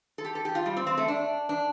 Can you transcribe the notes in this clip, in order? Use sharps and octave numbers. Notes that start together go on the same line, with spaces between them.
A4
G4
A4
G4
F4
G3
C4
C4
A3
D4
D4